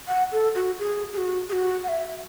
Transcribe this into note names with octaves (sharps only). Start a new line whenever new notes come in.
F#5
A4
F#4
G#4
G#4
F#4
G#4
F#4
F#5
E5